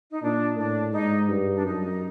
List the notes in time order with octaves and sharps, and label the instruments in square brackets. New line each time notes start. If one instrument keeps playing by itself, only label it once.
[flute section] D#4
[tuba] A#2 [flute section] D4
[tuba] A2 [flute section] D4
[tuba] G#2 [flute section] D#4
[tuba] G2
[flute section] D4
[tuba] F#2 [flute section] D#4